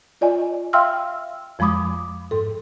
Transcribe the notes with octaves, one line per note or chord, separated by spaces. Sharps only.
F4 D5 D#5 G#5
E5 F5 G5 C6 E6 F6
F2 F3 G#3 B5 D6 D#6
G#2 A4